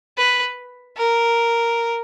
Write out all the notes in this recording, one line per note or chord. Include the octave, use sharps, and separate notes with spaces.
B4
A#4